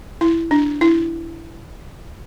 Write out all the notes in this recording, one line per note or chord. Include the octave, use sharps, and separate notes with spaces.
E4
D4
E4